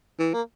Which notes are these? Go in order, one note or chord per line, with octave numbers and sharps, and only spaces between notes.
E3
A#3